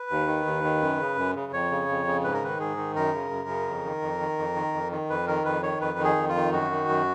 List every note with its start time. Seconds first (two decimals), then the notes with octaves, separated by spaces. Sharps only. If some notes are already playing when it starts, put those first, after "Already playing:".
Already playing: B4
0.10 D#2
0.27 D#3
0.46 D#2
0.64 D#3
0.82 F#2
1.00 C#3
1.17 F#2
1.35 C#3
1.52 F2 C#5
1.71 C#3
1.89 F2
2.07 C#3
2.24 G#2 B4
2.34 A#4
2.42 D#3 B4
2.59 G#2 G#4
2.77 D#3
2.96 F#2 A#4
3.14 C#3
3.31 F#2
3.49 C#3
3.67 F2
3.85 D#3
4.02 F2
4.20 D#3
4.39 F2
4.56 D#3
4.73 F2
4.92 D#3
5.10 F2 B4
5.27 D#3 A#4
5.45 F2 B4
5.63 D#3 C#5
5.81 F2 B4
5.98 D#3
6.04 G#4
6.16 F2
6.29 F4
6.35 D#3
6.52 F#2 F#4
6.71 D#3
6.89 F#2